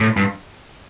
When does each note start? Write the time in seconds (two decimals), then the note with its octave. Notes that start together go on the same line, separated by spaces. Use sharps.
0.01 A2
0.17 G2